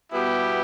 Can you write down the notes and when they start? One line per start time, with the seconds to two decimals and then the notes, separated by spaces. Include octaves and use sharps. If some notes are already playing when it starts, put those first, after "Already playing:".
0.11 B2 G3 B3 E4 G4